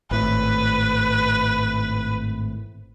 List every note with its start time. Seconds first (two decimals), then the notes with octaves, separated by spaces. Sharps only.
0.11 G#1 A2 B4